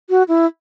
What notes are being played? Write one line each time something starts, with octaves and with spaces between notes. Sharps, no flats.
F#4
E4